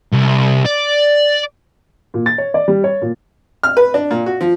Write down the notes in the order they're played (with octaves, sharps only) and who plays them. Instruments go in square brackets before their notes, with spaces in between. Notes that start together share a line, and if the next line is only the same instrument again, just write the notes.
[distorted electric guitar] C2
D5
[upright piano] A#2
A6
C#5
D5
G3
C#5
A#2
[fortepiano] F6
B4
D4
A#2
F#4
F3